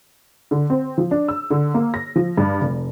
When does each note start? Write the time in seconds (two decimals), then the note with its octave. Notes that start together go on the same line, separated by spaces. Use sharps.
0.51 D3
0.70 C4
0.98 F3
1.11 D4
1.28 E6
1.50 D3
1.74 A#3
1.94 A#6
2.16 F3
2.37 G2
2.61 F1